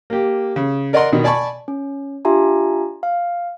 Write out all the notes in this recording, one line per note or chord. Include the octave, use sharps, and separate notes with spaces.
A#3 G4
C#3
A#4 D5 D#5 F#5 A#5 C6
B2 D#3
D5 G#5 A5 B5 C#6
C#4
D4 F4 G4 E5 G#5 A#5
F5